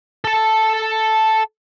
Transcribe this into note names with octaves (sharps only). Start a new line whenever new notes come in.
A4 A5